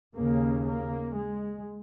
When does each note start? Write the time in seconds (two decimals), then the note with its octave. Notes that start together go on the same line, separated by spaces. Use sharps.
0.15 D#2 C#3 A#3
0.66 A#3
1.16 G#3